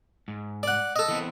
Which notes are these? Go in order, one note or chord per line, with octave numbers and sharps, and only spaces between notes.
G#2
D5 F#5
A4 D#5
E3 B3 C4